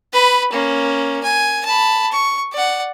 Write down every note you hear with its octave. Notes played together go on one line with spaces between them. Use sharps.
B4 B5
A#3 C#4
G#5
A5 B5
C#6
D5 F#5